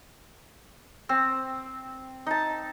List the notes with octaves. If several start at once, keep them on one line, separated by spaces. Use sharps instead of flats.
C4
D#4 A5